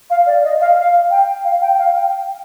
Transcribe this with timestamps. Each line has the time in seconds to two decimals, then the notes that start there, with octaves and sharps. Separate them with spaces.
0.10 F5
0.26 D5
0.44 D#5
0.60 F5
0.78 F5
1.10 G5
1.45 F5
1.61 G5
1.78 F5
1.95 G5